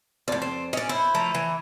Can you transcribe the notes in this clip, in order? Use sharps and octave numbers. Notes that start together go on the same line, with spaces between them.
F2 A2 D5
C4
C#4 D5 D#5
E4 C5
F3 A3 A#5
E3